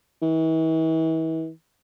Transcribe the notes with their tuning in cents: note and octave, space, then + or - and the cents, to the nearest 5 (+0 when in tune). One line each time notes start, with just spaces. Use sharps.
E3 -40